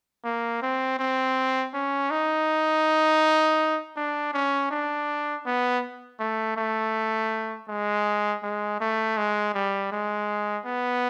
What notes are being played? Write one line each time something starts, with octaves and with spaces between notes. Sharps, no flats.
A#3
C4
C4
C#4
D#4
D4
C#4
D4
B3
A3
A3
G#3
G#3
A3
G#3
G3
G#3
B3